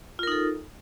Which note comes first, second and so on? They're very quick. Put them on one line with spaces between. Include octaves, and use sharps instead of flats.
F4 A#4 D#4 A4